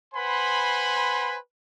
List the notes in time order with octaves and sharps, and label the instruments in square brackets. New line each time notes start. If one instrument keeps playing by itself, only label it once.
[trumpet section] B4 C5 F#5 G#5 B5 C6